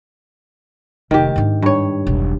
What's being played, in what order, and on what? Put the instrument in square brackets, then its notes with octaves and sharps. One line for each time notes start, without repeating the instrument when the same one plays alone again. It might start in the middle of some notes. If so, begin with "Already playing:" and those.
[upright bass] F1 [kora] D#3 G4
[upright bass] G#2 D4
[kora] G2 C#5
[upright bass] E1 B1